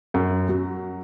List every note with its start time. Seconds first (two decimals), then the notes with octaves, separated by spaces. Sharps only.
0.14 F#2
0.49 F#3